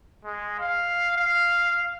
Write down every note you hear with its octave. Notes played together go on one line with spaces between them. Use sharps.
G#3
F5
F5